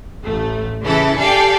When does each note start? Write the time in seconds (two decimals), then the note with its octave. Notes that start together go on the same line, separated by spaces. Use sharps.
0.25 A1 A3
0.83 C#3 E3 E4 A4
1.18 G4 A4 D5 F5 G5 G#5